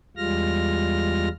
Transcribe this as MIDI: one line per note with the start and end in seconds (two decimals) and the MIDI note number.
0.17 1.29 40
0.17 1.29 55
0.17 1.29 56
0.17 1.29 65
0.17 1.29 89
0.17 1.29 94